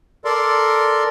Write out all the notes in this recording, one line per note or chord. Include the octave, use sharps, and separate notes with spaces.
A4 A#4 D5 C6